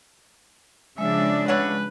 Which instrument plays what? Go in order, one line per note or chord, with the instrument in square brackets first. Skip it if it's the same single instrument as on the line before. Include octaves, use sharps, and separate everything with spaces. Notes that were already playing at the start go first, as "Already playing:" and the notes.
[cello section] C#3 F3 D4 [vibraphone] G#3 [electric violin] E5
[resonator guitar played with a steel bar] A3 C#5 F#5 [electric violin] B4